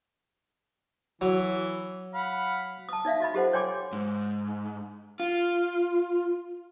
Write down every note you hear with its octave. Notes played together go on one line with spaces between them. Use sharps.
E3 F#3
F5 F#5 B5
A5 D#6
D#4 D5 E5 F5
F#4 D#5 B5
F4 G4 A4 C5 F#5
C#5 D5 G5 G#5 C6 D6
G#2
F4